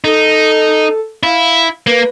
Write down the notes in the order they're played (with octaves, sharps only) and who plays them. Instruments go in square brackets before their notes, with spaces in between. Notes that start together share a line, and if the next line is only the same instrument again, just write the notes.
[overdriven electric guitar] D#4 [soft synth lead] A4
[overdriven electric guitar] E4 [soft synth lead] F5
[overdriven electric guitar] A#3 [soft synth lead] B4